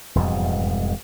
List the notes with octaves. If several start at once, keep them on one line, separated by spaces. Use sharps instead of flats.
E1 F2 G#2 G3